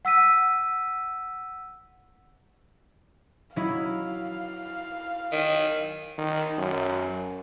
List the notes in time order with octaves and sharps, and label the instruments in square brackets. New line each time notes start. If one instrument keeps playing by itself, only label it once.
[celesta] F#5 E6 B6 D#7
[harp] F#3 D#4 E4 [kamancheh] F5
[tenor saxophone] D#3
[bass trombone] D#3
F#2